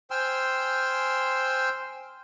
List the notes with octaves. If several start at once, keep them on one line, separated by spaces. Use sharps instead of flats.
C5 G5 G#5 C6 E6 F6